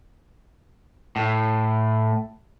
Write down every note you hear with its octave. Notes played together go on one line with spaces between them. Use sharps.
A2